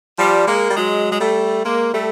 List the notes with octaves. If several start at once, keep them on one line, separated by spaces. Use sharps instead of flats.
F3 G3
G#3 A#3
G3
F#3 G#3
G#3
G3 A3
G#3 A#3
G3 A3